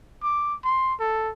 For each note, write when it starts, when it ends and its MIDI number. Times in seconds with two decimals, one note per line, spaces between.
0.23 0.55 86
0.64 0.94 84
1.00 1.31 69